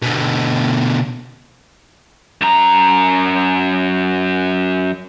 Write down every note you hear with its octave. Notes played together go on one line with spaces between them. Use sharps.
B2 D3
F#2 A#5